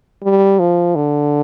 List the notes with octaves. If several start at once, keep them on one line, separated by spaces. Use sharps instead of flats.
G3
F3
D3